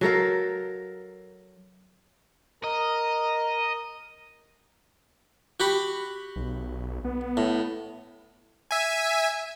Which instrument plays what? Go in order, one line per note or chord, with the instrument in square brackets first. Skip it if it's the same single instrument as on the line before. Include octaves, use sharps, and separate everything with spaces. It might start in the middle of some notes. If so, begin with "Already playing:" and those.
[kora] F#3 A4 A#4 F5
[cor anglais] A#4 [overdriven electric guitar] D#5
[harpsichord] F#4 G4 B5
[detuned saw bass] B1
B3
[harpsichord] A2
[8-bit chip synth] E5 G#5